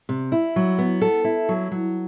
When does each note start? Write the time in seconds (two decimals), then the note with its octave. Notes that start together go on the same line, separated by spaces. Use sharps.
0.09 C3
0.32 E4
0.56 F#3
0.78 B3
1.01 A4
1.24 E4
1.49 F#3
1.71 F#3